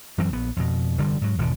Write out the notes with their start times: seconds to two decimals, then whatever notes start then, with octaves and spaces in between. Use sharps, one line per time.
0.18 F#2 E3 F#3 C4
0.33 A#1 B3
0.57 F2 B2
0.98 F1 G2 D3 G3
1.21 G#2 F#3
1.38 G#1 E2 B2 D3